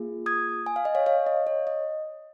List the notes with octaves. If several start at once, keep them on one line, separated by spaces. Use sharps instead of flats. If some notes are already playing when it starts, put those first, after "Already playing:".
Already playing: A#3 F4 G#4
D#6 G#6
G#5
F5
D#5
C#5 F5
C#5 F5
D#5
C#5
D#5